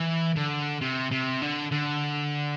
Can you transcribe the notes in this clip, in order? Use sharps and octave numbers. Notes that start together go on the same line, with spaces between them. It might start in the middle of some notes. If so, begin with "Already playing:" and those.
Already playing: E3
D3
C3
C3
D3
D3